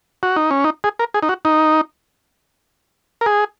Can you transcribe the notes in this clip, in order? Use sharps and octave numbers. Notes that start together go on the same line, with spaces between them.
F#4
D#4
C#4
D#4
G#4
A#4
G#4
D#4
F#4
D#4
A#4
G#4